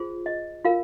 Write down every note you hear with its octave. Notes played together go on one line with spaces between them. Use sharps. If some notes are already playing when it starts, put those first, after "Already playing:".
Already playing: F4 G#4 C5
D#5
F4 A#4 F5